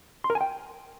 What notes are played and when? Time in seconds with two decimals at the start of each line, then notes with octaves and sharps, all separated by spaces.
0.24 C6
0.30 A#4
0.35 G#5
0.41 G5